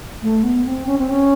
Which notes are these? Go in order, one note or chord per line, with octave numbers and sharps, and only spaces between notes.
A3
B3
C4
C#4
C4
C#4